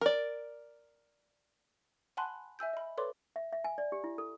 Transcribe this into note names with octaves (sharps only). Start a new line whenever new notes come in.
A#4 D5
F#5 G#5 A5 B5 C6 F#6
E5 G#5 E6 G6
D#5 B5
A4 B4 C#5 D5 C6 D6
E5
E5
G#5
D5
G4
E4
A4